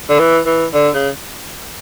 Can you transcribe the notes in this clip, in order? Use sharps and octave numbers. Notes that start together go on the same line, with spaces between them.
D3
E3
E3
D3
C#3